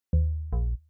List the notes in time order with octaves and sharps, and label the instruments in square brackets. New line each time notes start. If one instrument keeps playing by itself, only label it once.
[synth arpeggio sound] D#2
[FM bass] A#1